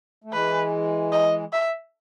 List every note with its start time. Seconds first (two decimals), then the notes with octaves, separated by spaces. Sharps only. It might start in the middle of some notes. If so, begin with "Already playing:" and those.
0.24 A3
0.33 E3 G#3 B4
1.12 D#5
1.53 E5